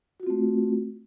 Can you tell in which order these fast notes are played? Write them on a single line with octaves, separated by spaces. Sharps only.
F#4 F4 C4 A3